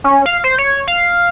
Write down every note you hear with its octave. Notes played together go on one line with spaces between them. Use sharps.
C#4
F5
C5
C#5
F5